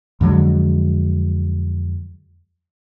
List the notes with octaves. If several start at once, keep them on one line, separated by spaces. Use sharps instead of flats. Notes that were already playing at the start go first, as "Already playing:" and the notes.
F2 D3 F#3 G#3